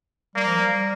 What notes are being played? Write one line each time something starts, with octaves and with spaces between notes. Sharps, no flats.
G3 A#3
F3
G3